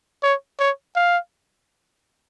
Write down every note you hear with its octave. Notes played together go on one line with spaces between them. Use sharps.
C#5
C#5
F5